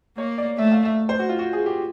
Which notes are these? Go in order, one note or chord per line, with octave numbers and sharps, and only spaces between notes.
A#3 C#5
D5
A3 E5
F5
E5
C5
F#4
F4
F#4
G#4
G4